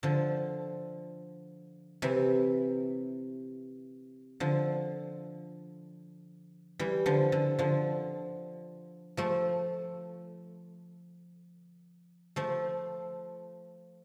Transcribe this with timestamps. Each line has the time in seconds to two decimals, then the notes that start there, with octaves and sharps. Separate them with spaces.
0.03 D3 F3
2.02 C3 E3
4.40 D3 F3
6.79 E3 G3
7.06 D3 F3
7.32 D3
7.59 D3 F3
9.17 F3 A3
12.36 F3 A3